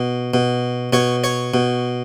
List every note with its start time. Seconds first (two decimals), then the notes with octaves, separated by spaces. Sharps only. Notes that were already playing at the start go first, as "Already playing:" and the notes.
Already playing: B2
0.34 B2
0.93 B2 C#5
1.24 C#5
1.54 B2